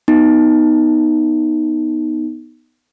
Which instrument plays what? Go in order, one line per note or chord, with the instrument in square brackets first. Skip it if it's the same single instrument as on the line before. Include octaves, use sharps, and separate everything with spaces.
[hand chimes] B3 D#4